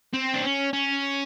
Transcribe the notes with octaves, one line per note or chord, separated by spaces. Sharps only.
C4
D4
C#4
C#4